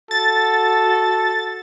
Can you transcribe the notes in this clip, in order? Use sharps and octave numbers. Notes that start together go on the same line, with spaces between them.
F#4 A4 A6